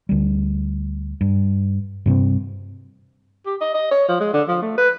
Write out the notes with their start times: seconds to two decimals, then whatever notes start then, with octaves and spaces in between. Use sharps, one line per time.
0.09 D2 G3
1.21 G2
2.06 G2 C3 G3 C4
3.46 G4
3.61 D#5
3.74 D#5
3.91 C#5
4.08 F3
4.20 G#3
4.33 D3
4.48 F3
4.62 A3
4.78 B4